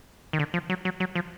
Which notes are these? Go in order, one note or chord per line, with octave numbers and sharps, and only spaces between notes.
D#3
D3
F3
F#3
F#3
F#3
F3